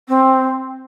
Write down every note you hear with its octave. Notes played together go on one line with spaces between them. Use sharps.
C4